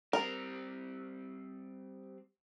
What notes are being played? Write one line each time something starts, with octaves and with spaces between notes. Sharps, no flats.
G3 C4 A#4